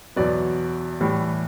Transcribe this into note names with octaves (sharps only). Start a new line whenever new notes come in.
E2 B2 F#3 B3 D5
A2 E3 G3